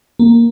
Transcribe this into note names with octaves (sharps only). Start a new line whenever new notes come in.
A#3